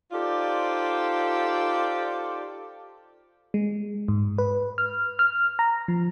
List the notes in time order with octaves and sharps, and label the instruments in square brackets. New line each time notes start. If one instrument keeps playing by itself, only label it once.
[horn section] D#4 F4 G4 A4 C5 D5
[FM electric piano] G#3
G#2
B4
F6
F6
A#5
F3